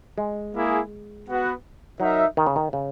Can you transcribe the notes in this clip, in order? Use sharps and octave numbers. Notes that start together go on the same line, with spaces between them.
G#3
A#3 E4 G#4
B3 F#4 B4 F#5
F#3 D#4 A#4 E5
D#3
C#3
D#3
C#3